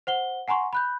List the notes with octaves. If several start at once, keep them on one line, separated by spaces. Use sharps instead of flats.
C5 F#5 G7
F#5 G#5 A#5 C6 C#6
B5 F#6 G6